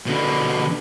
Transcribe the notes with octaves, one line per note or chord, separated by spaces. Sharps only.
B2 D3